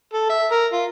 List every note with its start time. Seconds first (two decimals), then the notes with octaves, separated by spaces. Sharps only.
0.14 A4
0.30 E5
0.52 A#4
0.73 F4